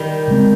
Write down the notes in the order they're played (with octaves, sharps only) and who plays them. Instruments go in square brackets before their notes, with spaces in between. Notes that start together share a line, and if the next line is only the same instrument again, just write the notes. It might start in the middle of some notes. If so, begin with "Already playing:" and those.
Already playing: [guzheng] D#3 G3
[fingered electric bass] C#3 G#3 C4